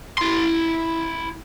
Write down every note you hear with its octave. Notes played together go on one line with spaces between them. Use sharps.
E4 C6